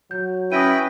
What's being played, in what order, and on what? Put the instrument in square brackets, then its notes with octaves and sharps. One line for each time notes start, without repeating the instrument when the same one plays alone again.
[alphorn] F#3 [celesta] G6
[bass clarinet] C#4 [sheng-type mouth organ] E4 B4 G5 [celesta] D#6 A#6 D#7